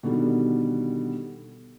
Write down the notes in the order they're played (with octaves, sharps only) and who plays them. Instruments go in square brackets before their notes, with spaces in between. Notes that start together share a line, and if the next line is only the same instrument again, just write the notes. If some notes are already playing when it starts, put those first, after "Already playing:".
[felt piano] B2 D3 D#3 G3